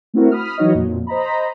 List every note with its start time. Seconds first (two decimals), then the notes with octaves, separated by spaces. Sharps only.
0.14 A3 C4 E4 F#4 A#4
0.31 B5 D#6 F6
0.58 E3 F#3 D#4 F#4 C#5 D#5
0.74 F2 A#2
1.07 C5 D#5 A#5 B5